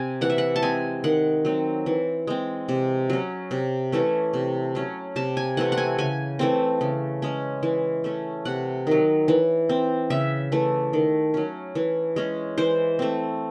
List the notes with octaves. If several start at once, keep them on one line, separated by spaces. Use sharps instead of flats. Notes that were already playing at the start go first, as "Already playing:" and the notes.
Already playing: C3 C4 G#5
E3 F#5
E5
F#5
A5
G#3 C4 G#5
D#3 F#5
F#3 C4
E3
G#3 C4
C3
F#3 C#4
C3
E3 A3 C#4
C3
F#3 C#4
C3 A5
G#5
E3 A3 C4 F#5
F#5
G#5
C#3 G#5
E3 A3 C4
C#3
G#3 C#4
E3
A3 C#4
C3 F#5
D#3 F#3
E3
C4
C#3 E5
E3 A3
D#3
F#3 C#4
E3
G#3 C#4
E3 C5
A3 C4